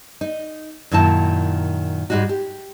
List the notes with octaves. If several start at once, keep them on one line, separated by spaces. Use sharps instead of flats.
D#4
F#2 A#2 D#3 E4 A5
G#2 G3 G#3 D#4 F#4
G4